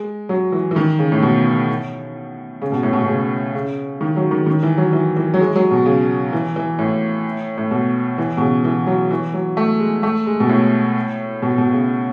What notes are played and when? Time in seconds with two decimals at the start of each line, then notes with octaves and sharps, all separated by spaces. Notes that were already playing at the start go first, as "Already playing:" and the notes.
Already playing: G#3
0.29 F#3
0.52 E3
0.71 E3
0.76 D#3
0.99 C#3
1.12 A2
1.22 B2
2.62 C#3
2.72 B2
2.83 A2
2.93 B2
3.03 B2
3.08 C#3
3.55 C#3
4.01 D#3
4.16 F#3
4.31 D#3
4.46 D#3
4.63 E3
4.78 F#3
4.93 E3
5.17 E3
5.34 F#3
5.40 G#3
5.56 F#3
5.71 B2
5.86 C#3
6.33 E3
6.56 E3
6.79 A2
7.58 A2
7.71 B2
8.18 E3
8.37 B2
8.41 C#3
8.64 E3
8.87 F#3
9.11 E3
9.34 F#3
9.57 A3
9.79 G#3
10.03 A3
10.27 G#3
10.40 B2
10.49 A2
11.42 B2
11.58 B2
11.73 C#3